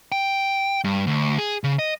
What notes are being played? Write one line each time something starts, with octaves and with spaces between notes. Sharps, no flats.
G5
G2
D2
G#4
C#3
D#5